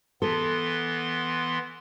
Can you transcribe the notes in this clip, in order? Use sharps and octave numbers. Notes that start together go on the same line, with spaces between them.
E3 B3 A4 C6